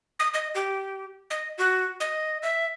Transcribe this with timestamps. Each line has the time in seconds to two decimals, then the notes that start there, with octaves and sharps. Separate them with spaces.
0.19 D#6
0.34 D#5
0.55 G4
1.30 D#5
1.58 F#4
2.00 D#5
2.43 E5